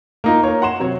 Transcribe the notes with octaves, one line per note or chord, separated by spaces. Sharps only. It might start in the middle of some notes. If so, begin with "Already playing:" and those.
A#3 D#4 F4
A#4 C#5
F#5 C6 E7
C3 F#3 C#5